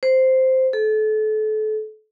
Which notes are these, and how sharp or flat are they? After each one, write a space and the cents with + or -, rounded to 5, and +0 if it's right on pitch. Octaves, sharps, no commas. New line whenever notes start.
C5 -5
A4 -30